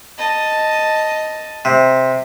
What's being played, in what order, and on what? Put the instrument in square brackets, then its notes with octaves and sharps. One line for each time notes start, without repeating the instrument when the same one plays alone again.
[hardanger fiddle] D#5 A5
[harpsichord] C3